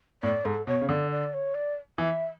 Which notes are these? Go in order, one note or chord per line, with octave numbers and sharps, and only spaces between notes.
A2 D5
G#2 A4
B2 C#5
C#3
D3 D5
D5
C#5
D5
E3 E5